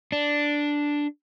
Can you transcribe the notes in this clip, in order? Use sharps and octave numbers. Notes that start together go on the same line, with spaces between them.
D4